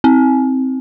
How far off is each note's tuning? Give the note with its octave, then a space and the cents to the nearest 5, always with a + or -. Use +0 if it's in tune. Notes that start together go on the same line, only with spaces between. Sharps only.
C4 +0